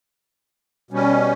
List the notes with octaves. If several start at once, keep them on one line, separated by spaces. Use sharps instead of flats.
B2 G3 C#4